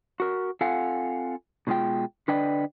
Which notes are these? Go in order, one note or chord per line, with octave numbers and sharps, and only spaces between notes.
F#4 A#4
C4 F4 A4 F5 F#5 G#5
B2 D#3 G#3 F4 G5
D3 D4 B4 D5 D#5 G5